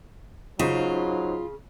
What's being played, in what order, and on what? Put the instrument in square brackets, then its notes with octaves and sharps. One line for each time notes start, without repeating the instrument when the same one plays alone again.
[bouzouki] C#3 [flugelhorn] F#3 [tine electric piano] D#4 C5 D#5 [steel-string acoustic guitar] F4